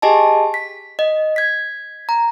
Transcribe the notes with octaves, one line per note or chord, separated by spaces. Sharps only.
G4 G#4 D#5 G#5 A5
B6
D#5
G#6 B6
A#5